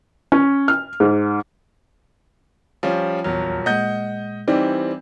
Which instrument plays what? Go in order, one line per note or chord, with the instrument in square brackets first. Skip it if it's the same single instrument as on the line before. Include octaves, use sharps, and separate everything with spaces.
[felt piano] C#4
F6
G#2
[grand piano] F3 G3 C#4
[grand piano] D#1 F#3 [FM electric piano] A#1 E2 F6
[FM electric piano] A#2 G#3 [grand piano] D#5 F#5 G6
[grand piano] E3 G3 C4 [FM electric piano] D#4 D5